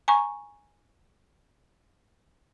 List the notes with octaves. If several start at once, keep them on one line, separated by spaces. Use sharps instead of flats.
G#5 A#5 C#6